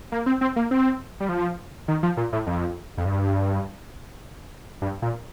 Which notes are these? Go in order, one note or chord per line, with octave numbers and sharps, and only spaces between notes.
A#3
C4
C4
A#3
C4
G3
F3
D#3
F3
A#2
A2
F2
F2
G2
G2
A#2